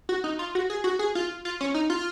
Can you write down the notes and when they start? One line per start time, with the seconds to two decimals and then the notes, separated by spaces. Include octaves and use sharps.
0.09 F#4
0.24 D#4
0.39 F4
0.55 F#4
0.70 G#4
0.84 F#4
0.99 G#4
1.15 F4
1.45 F4
1.60 C#4
1.74 D#4
1.90 F4